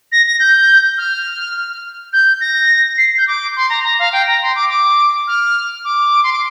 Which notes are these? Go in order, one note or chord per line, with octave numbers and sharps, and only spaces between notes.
A#6
A#6
G6
F6
G6
A#6
C7
G6
D6
C6
A#5
A#5
F5
G5
A#5
C6
D6
D6
F6
D6
C6
D6